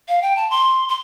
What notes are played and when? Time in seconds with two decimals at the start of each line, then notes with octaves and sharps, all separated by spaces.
0.08 F5
0.22 G5
0.36 A5
0.50 C6
0.88 C6